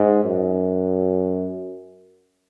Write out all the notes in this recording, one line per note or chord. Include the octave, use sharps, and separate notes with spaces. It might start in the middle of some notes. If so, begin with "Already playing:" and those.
Already playing: G#2
F#2